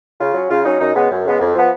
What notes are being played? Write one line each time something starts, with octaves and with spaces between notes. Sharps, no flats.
C#3 F4
F#3 C#4
C#3 F4
F#3 C#4 D#4
F#2 D#4
C#3 G#3 B3
F#2
C#3 G#3 B3
F2
F3 B3